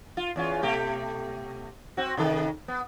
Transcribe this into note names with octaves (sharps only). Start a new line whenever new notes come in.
F4
E2 C#4 F4
B2 A3 G4
C4 F#4
C3 D#3 A4
B3